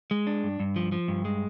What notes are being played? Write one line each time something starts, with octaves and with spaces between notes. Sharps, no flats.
G#3
D4
G2
G2
F3
F3
G2
G#3